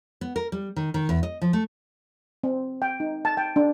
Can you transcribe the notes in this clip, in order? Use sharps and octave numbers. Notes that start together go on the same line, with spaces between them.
B3
A#4
G3
D#3
D#3
E2
D#5
F3
A3
C4
G5
D#4
A5
G5
D4